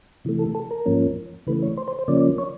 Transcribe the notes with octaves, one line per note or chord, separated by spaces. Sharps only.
C3 E3 A3
A4
A4
A#4
G#2 F3 A#3 C#4
C#3 E3 A3 B4
C#5
C5
C5
C5
C#3 F3 A#3 C#4 D5
C#5